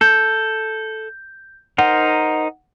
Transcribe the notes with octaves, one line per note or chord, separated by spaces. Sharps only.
A4 G6
D#4 A#4 C5 F#5